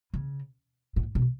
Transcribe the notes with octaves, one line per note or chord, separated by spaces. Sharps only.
C#3
A2
B2